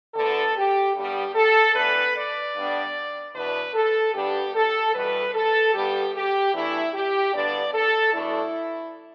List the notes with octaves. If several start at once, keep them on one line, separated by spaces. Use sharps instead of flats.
D2 D3 B3 A4
G4
G2 G3 B3 G4
A4
A2 E3 B3 D4 B4
D5
G2 G3 B3 D4
E2 B2 B3 D4 B4
A4
G2 G3 B3 D4 G4
A4
E2 B2 G3 B4
A4
G2 G3 B3 D4 G4
G4
E2 E3 A3 D4 E4
G4
G2 D3 B3 D4 D5
A4
E2 B2 A3 D4 E4